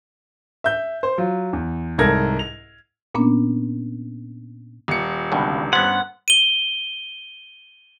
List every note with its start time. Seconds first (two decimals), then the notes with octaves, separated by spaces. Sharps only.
0.64 E5 G6
1.03 C5
1.18 F#3 F4
1.53 E2
1.98 C2 G#2 A4 A#4 G#6 A#6
2.39 F7
3.15 A#2 A#3 B3 C#4 D4
4.88 D#1 C#7
5.32 C#2 G2 B2 D3 D#3
5.73 G2 B3 C#4 C5 F#5
6.28 D#7 G7